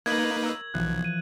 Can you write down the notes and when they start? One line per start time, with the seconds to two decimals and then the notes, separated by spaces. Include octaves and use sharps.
0.06 A#3 D#4 B4 C#6 F#6 G#6 F#7
0.43 A#4 E6
0.74 B1 E3 F3 F#6
1.05 D#7